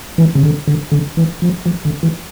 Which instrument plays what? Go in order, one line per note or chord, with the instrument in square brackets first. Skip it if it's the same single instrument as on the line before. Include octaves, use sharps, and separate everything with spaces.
[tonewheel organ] E3
C#3
D3
D3
D3
E3
F3
F3
D3
E3